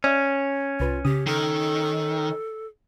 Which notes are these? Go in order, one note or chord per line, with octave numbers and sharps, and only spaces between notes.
C#4 D5 E5
C2 F4 B4
C#3 G4 D#6
D#3 A4